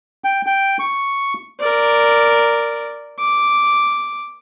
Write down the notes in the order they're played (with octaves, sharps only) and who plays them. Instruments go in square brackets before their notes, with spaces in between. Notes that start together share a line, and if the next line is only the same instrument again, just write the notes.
[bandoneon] G5
G5
C#6
[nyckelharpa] A#4 D5
D6